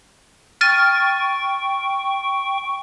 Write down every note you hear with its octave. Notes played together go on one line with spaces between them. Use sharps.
G5 C#6 F6 A6 D#7